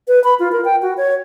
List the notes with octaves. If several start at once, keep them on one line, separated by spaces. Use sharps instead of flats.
B4
B5
F4
A#4
G5
F#4
C#5